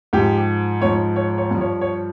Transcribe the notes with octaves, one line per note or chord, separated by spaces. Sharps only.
G#2 F3 G4
G#2 F3 C#5
C#5
C#5
G2 F3
C#5
C#5